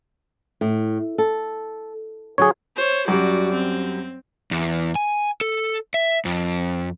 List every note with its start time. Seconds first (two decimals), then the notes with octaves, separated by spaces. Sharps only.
0.61 A2
1.18 A4
2.38 D3 F#3 G#4 C#5
2.76 C5 C#5
3.08 F#2 G3 F#4 D5
3.53 C4
4.51 E2
4.95 G#5
5.41 A4
5.94 E5
6.25 F2